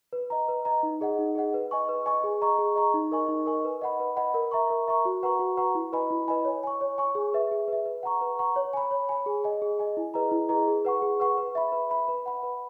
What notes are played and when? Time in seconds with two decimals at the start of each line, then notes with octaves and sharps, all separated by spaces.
0.13 B4
0.30 D#5 A#5
0.48 B4
0.65 D#5 A#5
0.83 D#4
1.01 G#4 D#5 F#5
1.19 D#4
1.35 G#4 D#5 F#5
1.54 B4
1.71 D#5 G#5 C#6
1.89 B4
2.06 D#5 G#5 C#6
2.24 G#4
2.42 D#5 A#5 C#6
2.58 G#4
2.76 D#5 A#5 C#6
2.94 D#4
3.12 A#4 D#5 G#5 C#6
3.28 D#4
3.46 A#4 D#5 G#5 C#6
3.65 B4
3.81 D#5 F#5 B5
4.00 B4
4.17 D#5 F#5 B5
4.34 A#4
4.51 E5 A#5 C#6
4.70 A#4
4.88 E5 A#5 C#6
5.05 F#4
5.23 B4 F#5 A#5 C#6
5.39 F#4
5.57 B4 F#5 A#5 C#6
5.75 E4
5.93 B4 D#5 G#5 B5
6.10 E4
6.28 B4 D#5 G#5 B5
6.45 C#5
6.63 G#5 C#6
6.81 C#5
6.98 G#5 C#6
7.15 G#4
7.34 B4 E5
7.51 G#4
7.68 B4 E5
7.85 B4
8.03 F#5 A#5 C#6
8.21 B4
8.39 F#5 A#5 C#6
8.56 C#5
8.73 G#5 B5
8.91 C#5
9.09 G#5 B5
9.26 G#4
9.44 D#5 G#5
9.62 G#4
9.79 D#5 G#5
9.97 E4
10.14 G#4 B4 D#5 A#5
10.31 E4
10.49 G#4 B4 D#5 A#5
10.68 G#4
10.85 B4 F#5 C#6
11.02 G#4
11.20 B4 F#5 C#6
11.38 B4
11.55 E5 B5
11.72 B4
11.89 E5 B5
12.08 B4
12.26 F#5 B5
12.43 B4